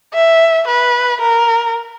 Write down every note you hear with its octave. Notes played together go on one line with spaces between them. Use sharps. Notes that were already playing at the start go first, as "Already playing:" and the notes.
E5
B4
A#4